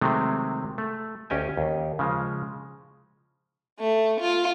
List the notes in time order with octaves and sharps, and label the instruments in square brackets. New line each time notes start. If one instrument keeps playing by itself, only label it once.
[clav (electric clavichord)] C3 D#3 F#3 G#3 A3 C4
A3
D2 C#4 G4 D#5 G#5
D#2
C#3 F3 G#3
[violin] A3
F4